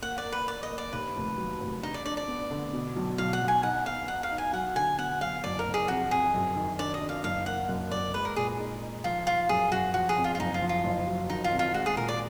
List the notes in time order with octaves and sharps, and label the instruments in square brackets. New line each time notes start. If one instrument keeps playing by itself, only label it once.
[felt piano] A#3 [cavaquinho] F#5
[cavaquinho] D5
[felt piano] A#4
[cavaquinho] B4
[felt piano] A#4 [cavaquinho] D5
[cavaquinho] D#5
[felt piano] A#3
[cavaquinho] D5
[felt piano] D#2 [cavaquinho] B4
[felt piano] F1
F#3
F1
[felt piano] D4 [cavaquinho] D#4
[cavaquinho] D5
[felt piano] D4 [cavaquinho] D5
[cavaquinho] D5
[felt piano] B3
D3
B2
B1
[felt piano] B1 [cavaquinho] F5
[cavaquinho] F#5
[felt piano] B1
[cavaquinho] G#5
[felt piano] D#4 [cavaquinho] F#5
[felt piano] B3 [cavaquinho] F5
[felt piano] D#4 [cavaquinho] F#5
[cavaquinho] F5
[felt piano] D#4
[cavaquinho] G#5
[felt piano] F#3 [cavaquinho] F#5
[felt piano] D3 [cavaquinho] G#5
[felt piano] B3 [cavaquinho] F#5
[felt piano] F#3 [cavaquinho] F5
[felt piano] F#1 [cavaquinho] D5
[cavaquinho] A#4
[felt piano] F#1
[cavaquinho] G#4
[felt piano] F2 [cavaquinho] F#4
[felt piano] F2 [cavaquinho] G#4
[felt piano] F#2
D#3
[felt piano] D4 [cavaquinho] D5
[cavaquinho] D#5
[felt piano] D4
[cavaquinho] F5
[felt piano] F#1 [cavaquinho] F5
[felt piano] A#3 [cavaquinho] F#5
[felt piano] F#2
[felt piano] F#2 [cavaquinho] D5
[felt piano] G#3 [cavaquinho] B4
[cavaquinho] A#4
[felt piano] A#2 [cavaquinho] G#4
[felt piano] D#4
D#4
[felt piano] F3 [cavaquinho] F4
[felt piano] F3 [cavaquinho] F4
[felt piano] F#2 [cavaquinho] G#4
[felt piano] F#2 [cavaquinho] F#4
[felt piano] F3 [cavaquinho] F#4
[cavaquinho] G#4
[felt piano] F2
[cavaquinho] F4
F4
[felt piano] F#1 [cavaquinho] D#4
[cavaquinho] F4
[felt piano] F3
[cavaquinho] F4
[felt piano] F#1
F#3
[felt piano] D#3 [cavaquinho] D#4
[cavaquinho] F4
[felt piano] F2
[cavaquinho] F4
[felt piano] G#3 [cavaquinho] F#4
[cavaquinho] G#4
[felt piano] A#2 [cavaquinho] A#4
[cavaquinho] D5